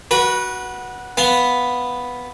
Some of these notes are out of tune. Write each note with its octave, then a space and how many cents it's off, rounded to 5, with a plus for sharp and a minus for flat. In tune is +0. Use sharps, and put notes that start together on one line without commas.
F#4 +0 B4 -25
B3 +0 F5 +0